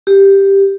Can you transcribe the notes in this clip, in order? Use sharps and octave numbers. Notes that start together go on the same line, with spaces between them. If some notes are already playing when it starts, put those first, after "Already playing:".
G4